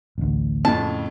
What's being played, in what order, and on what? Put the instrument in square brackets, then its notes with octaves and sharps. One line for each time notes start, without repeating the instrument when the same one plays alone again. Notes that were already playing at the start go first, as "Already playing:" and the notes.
[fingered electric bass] A1 D2
[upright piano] F2 A2 C#3 [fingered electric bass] C4 [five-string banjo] A5